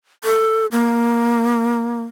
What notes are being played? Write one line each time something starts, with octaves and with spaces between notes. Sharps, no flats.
A4
A#3